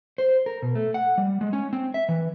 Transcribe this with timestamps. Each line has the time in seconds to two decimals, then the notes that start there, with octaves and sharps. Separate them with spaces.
0.18 C5
0.46 A#4
0.62 B2
0.75 A3
0.94 F#5
1.18 G3
1.41 G#3
1.53 C#4
1.73 C4
1.94 E5
2.09 E3